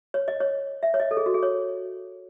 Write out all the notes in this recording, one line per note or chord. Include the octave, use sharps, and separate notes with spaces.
C#5
D#5
C#5
E5
C#5
D#5
A4
G#4
F#4
G#4
C#5